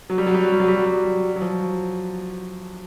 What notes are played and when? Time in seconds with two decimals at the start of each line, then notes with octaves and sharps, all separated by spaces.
0.10 F#3
0.18 G3
0.26 F#3
0.34 G3
0.43 F#3
0.52 G3
0.60 F#3
0.68 G3
0.76 F#3
0.85 G3
0.93 F#3
1.36 F#3
1.42 F3